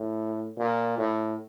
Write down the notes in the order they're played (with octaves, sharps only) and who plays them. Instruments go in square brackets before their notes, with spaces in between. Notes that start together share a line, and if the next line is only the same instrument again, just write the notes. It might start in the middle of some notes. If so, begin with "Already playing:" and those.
Already playing: [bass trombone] A2
A#2
A2